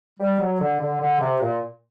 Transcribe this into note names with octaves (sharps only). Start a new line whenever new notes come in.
G3
F#3
D3
D3
D3
C3
A#2